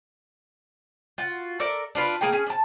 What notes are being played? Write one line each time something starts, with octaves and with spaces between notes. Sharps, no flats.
F4 F#4
A4 A#4 D5 E5
D4 F4 B4
A#3 G#4 A#4 G5
C#4 G#4
D4 A5